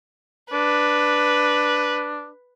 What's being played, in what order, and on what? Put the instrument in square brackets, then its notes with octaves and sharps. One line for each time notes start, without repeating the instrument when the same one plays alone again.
[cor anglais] D4 [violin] B4